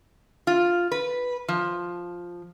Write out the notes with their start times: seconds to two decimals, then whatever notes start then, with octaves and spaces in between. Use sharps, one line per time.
0.47 F4
0.92 B4
1.48 F3